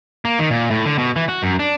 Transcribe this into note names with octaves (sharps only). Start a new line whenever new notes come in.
A#3
D#3
A#2
A2
D3
B2
E3
F#4
F#2
D4